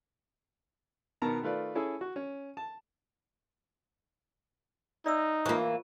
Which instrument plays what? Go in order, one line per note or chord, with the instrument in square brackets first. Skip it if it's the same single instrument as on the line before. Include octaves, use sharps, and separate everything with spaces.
[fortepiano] B2 D#3 B3 A#4 A5 A#5
D#3 A3 F4 B4 D5
C#4 E4 G#4 A4
F#4
C#4
A5
[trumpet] D#4 [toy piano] D5 E5 E6
[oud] E3 A#3 [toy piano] F4 C5 C#6